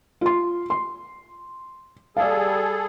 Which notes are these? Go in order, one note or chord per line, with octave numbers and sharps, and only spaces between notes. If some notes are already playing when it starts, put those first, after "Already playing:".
F4 C6
C6
G3 G#4 A4 D5 F5